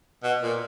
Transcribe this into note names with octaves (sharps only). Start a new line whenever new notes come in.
B2
A#2